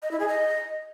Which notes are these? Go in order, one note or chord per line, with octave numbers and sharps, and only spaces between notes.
D#5
E4
G#4
D#5